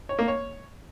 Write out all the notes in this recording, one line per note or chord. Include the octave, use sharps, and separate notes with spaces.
C#5
A#3
C#5